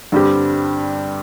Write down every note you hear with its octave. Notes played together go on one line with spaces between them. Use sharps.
G2 D3 G3 C4 G4